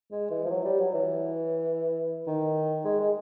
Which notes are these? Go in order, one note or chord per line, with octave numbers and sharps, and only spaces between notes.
G#3
E3
F3
F#3
G3
F#3
E3
D#3
G#3
G#3